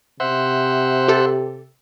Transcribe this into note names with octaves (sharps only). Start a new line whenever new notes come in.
C3 C5 E5 F#5
G4 A4